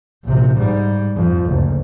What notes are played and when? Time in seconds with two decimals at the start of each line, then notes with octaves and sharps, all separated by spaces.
0.24 A#1 C3
0.56 G#2 G3
1.16 F2
1.48 F#1 D2